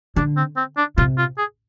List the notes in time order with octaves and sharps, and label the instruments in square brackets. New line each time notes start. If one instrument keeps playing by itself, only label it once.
[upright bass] D3 [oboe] D4
[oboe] C4
C4
D4
[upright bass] C3 [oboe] F4
[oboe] F4
G#4